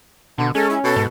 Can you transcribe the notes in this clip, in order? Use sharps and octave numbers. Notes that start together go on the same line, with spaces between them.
B2 D3
G#3 C#4 A4
E4
B2 A4
G#2